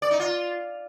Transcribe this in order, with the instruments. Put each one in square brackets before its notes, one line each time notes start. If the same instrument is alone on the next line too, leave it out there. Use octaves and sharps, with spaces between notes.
[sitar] D5
D#4
F4